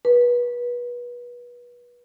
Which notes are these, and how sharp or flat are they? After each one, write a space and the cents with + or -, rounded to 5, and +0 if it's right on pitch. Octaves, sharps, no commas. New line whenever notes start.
B4 -30